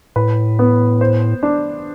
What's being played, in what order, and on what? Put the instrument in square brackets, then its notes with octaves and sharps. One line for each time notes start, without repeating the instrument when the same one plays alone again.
[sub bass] A2 [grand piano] B4
[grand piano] B3
C5
D4